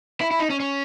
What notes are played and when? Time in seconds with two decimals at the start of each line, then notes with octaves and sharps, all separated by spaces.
0.21 E4
0.31 E4
0.40 D#4
0.50 C#4
0.60 C#4